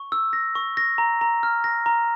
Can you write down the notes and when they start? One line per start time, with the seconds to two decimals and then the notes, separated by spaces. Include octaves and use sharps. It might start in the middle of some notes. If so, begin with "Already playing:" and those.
Already playing: C#6
0.12 E6
0.33 A#6
0.55 C#6
0.77 A#6
0.98 A#5
1.21 A#5
1.43 F6
1.64 A#6
1.86 A#5